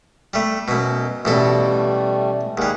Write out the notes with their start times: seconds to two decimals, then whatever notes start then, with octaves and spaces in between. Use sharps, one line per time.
0.34 G3 A3
0.68 F#2 B2
1.25 A1 B2 G3 A3 A4
2.57 D#2 G3 G#4 F#5